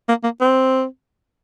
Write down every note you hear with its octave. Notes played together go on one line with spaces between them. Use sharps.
A#3
A#3
C4